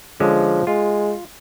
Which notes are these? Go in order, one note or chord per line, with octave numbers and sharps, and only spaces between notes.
D3 F3 G#3 C#4
G#3 F4